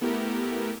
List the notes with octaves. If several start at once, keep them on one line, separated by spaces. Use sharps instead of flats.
A3 B3 E4 G4 A#4